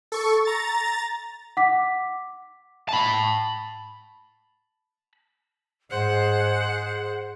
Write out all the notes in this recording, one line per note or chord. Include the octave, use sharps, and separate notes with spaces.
A4 C#6
A#5 A6
F#5 D6 B6
A5 B5
G#2 G#4 C5 F#5